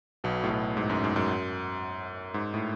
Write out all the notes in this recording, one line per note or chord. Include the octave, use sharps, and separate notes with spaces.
B1 B2
A2
B1 B2
G#2
F#2
G#2
F#2
G#2
A2